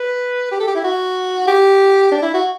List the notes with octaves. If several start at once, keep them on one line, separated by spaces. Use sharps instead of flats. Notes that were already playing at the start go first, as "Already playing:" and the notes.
Already playing: B4
G4
A4
G4
E4
F#4
G4
D4
E4
F#4